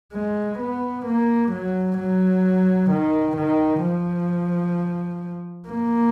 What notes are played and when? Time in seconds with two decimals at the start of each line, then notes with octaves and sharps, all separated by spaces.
0.13 G#3
0.59 B3
1.06 A#3
1.52 F#3
1.99 F#3
2.91 D#3
3.38 D#3
3.84 F3
5.68 A#3